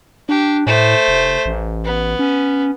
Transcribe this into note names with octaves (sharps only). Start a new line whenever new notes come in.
D4 G4
A2 A3 C5
F1
A1
B3
C#4